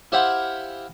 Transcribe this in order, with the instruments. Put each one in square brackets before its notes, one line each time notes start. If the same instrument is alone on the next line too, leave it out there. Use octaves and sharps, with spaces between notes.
[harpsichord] E4 G4 C5 F5 F#5 B5